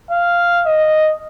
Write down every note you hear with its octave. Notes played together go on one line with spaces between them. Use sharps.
F5
D#5